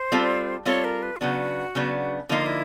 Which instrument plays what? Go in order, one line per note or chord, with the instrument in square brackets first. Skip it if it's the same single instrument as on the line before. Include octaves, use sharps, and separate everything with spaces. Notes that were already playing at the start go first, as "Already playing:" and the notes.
Already playing: [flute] C5
[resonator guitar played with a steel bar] G3 C4 F4 A4
[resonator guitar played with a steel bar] G3 C4 F4 A4 [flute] C#5
[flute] A#4
B4
F4
[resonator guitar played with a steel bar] C#3 F#3 B3 D4 [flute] F#4
[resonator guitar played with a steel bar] C#3 F#3 B3 D4
[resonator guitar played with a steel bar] D3 F3 A#3 D#4 [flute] F4
[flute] E4